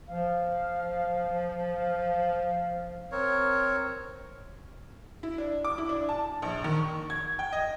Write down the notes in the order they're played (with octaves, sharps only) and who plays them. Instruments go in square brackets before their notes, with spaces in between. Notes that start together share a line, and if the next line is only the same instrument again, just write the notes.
[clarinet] F3 [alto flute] F5
[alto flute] F5
[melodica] C4 A#4 C#5
[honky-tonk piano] E4
D4
D6
E4
D4
A5
A#1
D#3
C#6
G#6
G5
D#5